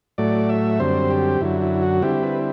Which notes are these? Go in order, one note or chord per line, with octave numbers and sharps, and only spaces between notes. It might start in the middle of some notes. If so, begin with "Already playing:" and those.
A2 F#3 A3 D5
E5
F#2 D3 G3 C4 C5
G4
F#2 D3 F#3 E4
E4
F#4
D3 G3 C4 E4 G4
B4